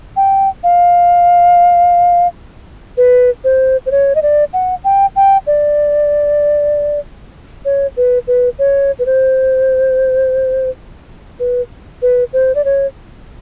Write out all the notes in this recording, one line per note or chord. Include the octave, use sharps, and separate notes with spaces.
G5
F5
B4
C5
C5
C#5
D#5
D5
F#5
G5
G5
D5
C#5
B4
B4
C#5
B4
C5
B4
B4
C5
D5
C#5